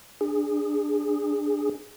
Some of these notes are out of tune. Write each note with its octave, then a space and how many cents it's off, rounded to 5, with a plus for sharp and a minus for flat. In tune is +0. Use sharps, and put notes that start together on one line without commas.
D4 +5 G#4 -15